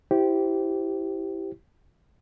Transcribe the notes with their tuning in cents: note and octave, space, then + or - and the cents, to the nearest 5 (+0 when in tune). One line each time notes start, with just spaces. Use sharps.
E4 +0 G4 -15 C5 +0